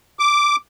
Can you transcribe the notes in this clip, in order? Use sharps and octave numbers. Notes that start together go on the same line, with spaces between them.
D6